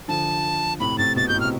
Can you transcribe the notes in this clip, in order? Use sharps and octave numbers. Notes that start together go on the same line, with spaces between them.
D3 F3 A5
A2 C3 B5
A2 C3 A6
B2 A6
B2 G6
A2
F6
C3